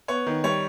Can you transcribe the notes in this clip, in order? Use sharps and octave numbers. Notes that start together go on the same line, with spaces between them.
B3 C#5
D#3
G3 C#5